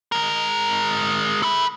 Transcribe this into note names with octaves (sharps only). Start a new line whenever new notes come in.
G#3 A#4
A4 B5